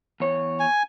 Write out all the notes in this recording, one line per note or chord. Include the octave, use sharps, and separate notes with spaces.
E2 C#5
G#5